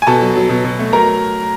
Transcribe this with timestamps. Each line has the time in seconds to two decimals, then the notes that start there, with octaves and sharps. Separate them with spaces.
0.02 G#5
0.07 B2 A4 A5
0.21 F#3
0.36 F#3
0.50 B2
0.64 B2
0.79 A3
0.93 F#3 A#4 A#5